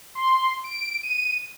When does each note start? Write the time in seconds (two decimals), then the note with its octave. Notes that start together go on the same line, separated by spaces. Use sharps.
0.15 C6
0.64 D7
1.03 D#7